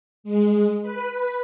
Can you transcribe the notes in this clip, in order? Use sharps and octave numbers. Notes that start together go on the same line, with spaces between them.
G#3
B4